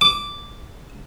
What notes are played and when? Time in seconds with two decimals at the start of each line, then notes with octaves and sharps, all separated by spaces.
0.01 D6